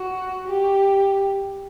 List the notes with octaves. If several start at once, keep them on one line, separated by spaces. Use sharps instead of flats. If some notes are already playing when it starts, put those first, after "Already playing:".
Already playing: F#4
G4